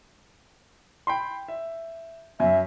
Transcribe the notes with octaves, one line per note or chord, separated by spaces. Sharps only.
G5 B5 C6
E5
F#2 E5